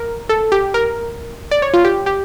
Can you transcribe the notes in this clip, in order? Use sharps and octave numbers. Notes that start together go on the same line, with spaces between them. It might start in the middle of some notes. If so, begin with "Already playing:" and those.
Already playing: A#4
A4
G4
A#4
D5
C#5
F4
G4
G4